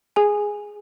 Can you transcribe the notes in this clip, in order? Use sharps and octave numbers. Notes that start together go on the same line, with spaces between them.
G#4 G#5